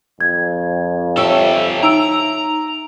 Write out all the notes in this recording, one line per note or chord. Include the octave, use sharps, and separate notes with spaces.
F2 G#6
G4 A4 C#5 E5
D#4 A#5 E6 D7